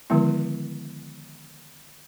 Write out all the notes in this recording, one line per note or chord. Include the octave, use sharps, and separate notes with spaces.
D3 D#3 F3 G#3 B3 E4